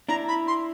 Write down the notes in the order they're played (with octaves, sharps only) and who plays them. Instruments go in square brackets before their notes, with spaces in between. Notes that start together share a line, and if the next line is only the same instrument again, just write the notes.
[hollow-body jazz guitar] D4 E4 [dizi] A#5
[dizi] B5
C6